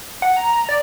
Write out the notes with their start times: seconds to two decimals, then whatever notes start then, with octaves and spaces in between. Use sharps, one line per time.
0.22 F#5
0.37 A#5
0.53 A#5
0.69 D5